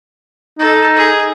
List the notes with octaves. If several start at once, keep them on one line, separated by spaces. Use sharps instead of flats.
D#4 A4
G#4